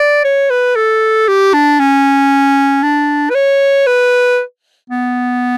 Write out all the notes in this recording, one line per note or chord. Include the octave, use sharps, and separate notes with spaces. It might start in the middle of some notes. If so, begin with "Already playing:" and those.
Already playing: D5
C#5
B4
A4
G4
D4
C#4
D4
B4
C#5
B4
B3